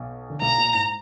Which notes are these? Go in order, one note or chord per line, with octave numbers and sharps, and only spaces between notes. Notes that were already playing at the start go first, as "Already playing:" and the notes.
Already playing: B1 B2
D3
B1 B2 A#5
A#2
G#2